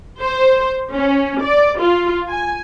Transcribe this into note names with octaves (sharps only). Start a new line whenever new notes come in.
C5
C#4
D5
F4
G#5